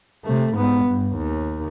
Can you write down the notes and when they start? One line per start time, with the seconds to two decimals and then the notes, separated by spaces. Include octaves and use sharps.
0.24 C3 A3
0.54 G#2 B3
0.85 G2
1.17 D#2